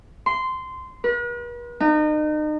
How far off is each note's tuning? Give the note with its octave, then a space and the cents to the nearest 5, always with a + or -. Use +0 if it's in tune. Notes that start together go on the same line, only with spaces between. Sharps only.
C6 -15
B4 -45
D#4 -35